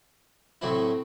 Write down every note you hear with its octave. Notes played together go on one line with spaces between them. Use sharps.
A2 F#3 A3 C4 E4